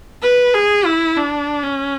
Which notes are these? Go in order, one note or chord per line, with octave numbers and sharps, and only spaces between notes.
B4
G#4
E4
D4
C#4